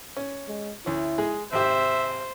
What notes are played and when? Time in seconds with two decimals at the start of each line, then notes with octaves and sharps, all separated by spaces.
0.17 C#4
0.48 G#3
0.86 D2 C#4 E4
1.18 G#3 G#4
1.53 G#1 C3 G4 C5 E5